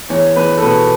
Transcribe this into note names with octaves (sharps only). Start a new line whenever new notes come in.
E2 C#5
E2 B4
A4
B2 B4